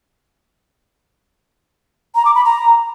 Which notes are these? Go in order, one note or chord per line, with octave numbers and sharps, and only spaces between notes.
A#5
D6
B5
A#5